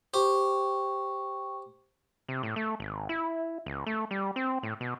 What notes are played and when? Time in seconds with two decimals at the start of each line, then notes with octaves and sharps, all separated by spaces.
0.14 G4 C5 G5 C#6
2.28 C3
2.43 A2
2.56 A3
2.80 G#1
3.09 E4
3.66 C#2
3.86 A3
4.11 G3
4.36 C4
4.63 A2
4.81 B2